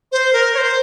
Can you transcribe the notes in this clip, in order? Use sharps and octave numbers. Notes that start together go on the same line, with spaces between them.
C5
A#4
C#5
C5